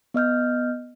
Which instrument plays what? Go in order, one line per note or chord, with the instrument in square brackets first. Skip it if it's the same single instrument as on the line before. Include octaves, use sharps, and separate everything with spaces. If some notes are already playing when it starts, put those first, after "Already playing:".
[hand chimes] B3 D#5 F6 G6